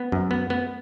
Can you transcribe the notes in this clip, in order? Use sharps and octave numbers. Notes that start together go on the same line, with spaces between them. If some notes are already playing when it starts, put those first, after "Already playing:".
Already playing: B3
F#2
B3
B3